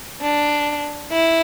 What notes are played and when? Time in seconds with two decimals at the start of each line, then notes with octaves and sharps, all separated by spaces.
0.22 D4
1.13 E4